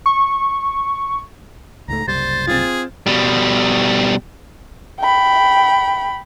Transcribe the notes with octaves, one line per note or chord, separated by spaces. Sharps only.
C#6
C#2 G#2 A3 A#5
F#1 C2 G3 C5 A6
C4 F4 G#4
B2 G3
G5 B5